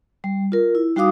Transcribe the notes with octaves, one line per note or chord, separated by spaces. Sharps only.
G3
F4 A#4
E4
G3 D#4 F#4 F5 D6 D#6